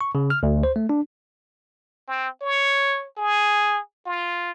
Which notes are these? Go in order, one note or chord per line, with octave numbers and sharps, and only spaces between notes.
C#6
C#3
F6
D2
C5
A3
D4
C4
C#5
G#4
F4